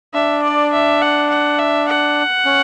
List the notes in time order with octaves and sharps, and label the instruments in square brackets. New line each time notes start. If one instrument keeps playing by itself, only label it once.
[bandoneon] D4 [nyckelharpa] E5
[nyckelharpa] D5
E5
F#5
F#5
E5
F#5
[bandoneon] C#4